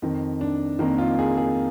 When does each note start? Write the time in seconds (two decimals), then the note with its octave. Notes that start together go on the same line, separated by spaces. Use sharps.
0.02 F2 D#3
0.41 D4
0.79 F2 D#3 A#3
0.98 F4
1.19 G#4
1.37 G#4